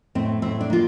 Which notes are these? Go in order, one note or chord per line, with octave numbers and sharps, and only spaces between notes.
A2 C4
A2 C4
D4
A#3 F4